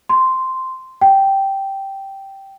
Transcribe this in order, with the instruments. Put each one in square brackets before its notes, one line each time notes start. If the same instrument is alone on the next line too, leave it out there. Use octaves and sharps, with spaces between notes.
[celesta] C6
G5